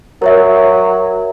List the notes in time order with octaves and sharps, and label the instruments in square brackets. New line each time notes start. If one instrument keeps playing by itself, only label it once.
[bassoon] F#3 [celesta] A#4 C#5 E5